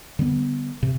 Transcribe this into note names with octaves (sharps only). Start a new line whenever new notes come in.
D3 G3 B3
C3